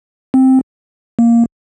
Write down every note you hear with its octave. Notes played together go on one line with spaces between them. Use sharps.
C4
A#3